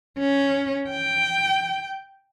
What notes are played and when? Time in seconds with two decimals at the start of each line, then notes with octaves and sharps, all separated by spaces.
0.19 C#4
0.89 G5